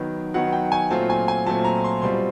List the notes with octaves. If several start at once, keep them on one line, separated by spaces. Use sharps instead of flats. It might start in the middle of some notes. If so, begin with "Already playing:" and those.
Already playing: D#3 F#3 B3
D#3 F#3 B3 F#5
G5
G#5
A#2 F#3 A3 C4 F4 A5
G#5
G#5
A#2 F#3 A3 C4 F4 A5
A#5
C6
B2 G3 C4 F4 C6